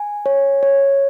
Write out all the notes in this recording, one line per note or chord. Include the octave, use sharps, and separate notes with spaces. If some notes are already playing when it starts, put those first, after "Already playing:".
Already playing: G#5
C#5
C#5